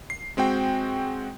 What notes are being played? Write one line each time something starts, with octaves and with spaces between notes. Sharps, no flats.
C7
G#3 C4 F#4 G5